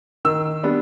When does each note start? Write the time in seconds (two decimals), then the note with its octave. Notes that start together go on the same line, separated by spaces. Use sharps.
0.25 D#3 E6
0.63 G3 B3 D4